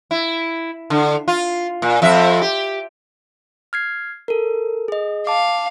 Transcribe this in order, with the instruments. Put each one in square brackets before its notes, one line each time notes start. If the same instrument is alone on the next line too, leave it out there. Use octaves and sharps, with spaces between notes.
[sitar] E4
D3
F4
A#2
F2 C4 E5
G4
[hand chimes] F6 G#6 C7
A4 A#4
G#4 D#5
[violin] F5 [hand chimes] A5 D6